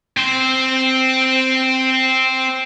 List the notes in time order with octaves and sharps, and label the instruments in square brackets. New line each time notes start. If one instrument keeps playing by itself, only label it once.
[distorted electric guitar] C4 C5